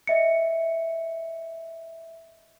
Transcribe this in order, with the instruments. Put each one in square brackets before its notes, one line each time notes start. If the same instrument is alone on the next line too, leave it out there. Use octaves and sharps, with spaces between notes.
[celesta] D#5 E5 C#7